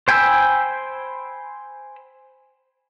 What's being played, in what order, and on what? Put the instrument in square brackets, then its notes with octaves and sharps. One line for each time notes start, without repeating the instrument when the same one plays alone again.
[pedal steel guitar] C5 G5 G#5 B5 E6